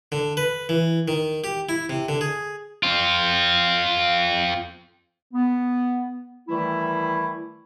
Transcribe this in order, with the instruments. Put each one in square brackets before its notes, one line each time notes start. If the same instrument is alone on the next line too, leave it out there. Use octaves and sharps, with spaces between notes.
[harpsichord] D3
B4
E3
D#3
G4
E4
C3
D3
G#4
[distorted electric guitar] C4 F4
[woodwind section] B3
D#3 E3 G3 A3 E4